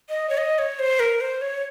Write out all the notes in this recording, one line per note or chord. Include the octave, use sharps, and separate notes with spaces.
D#5
C#5
D#5
C#5
C5
A#4
C5
C#5